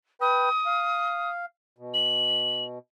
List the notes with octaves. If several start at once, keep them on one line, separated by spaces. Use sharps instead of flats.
B4 G5 D#6
F5
B2
F#7